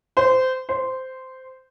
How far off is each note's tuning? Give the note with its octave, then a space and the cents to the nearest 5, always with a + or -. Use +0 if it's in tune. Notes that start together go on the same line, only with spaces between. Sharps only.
C5 -20
C5 -10